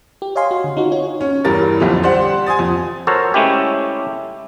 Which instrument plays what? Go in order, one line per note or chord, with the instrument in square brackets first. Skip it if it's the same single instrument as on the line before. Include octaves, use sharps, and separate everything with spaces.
[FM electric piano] G4
C#5 D#5 F5 G#5 C6
F#4
D3
D#4 F4 F#4
D#4 F#4 C#5
[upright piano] C#4
E2 G2 G3 A#4 A6
B1 F2 D3 G3
G4 C5 D5 F#5
G#5 C6 D#6 A6
F2
[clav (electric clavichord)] F#4 A4 A#4 C5 C#5
G#3 A3 C#4 E4 G4